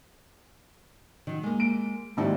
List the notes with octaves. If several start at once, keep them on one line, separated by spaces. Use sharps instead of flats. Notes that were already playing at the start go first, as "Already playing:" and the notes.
D#3 F#3
G#3 A#3
D7
A#1 D#2 G#2 G#3 D#4 E4